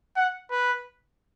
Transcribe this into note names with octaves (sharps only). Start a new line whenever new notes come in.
F#5
B4